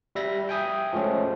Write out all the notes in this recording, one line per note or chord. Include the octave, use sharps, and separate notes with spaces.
G3 E5 A#6
E5 G5 G#5 D#6
F3 G#3 A3 C#4